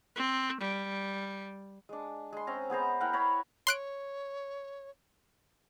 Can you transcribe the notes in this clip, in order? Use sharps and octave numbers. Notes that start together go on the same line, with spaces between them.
C4
G3
G#3 D4
G#3 C6
C4 C#4 A#5
B3 G#4 C5 A#5
E4 A#4 F#5 G5
C#5 A#5 B5
C#5 C6 F#6 D7